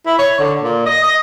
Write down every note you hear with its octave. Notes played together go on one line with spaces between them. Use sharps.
E4
C#5
D3
A#2
D#5
D#5